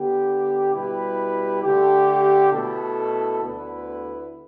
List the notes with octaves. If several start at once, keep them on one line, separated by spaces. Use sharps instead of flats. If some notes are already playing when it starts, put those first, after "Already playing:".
Already playing: D3 B3 G4
B2 G3 E4 G4 B4
D3 A3 G4
B2 A3 E4 A4
D2 D3 B3 E4 B4